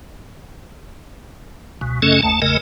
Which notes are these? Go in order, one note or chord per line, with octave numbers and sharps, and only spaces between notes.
C#2 B2
F#2 C#3 A3 C#4 A4 D#5
G1 D#2 A3 A5
G#1 E2 C#3 A3 A#4 D#5